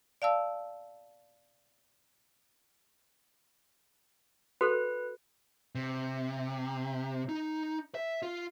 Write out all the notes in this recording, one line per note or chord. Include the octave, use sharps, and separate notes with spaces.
D5 F5 A5 E6
F#4 A4 B4 C5
C3
D#4
E5
F4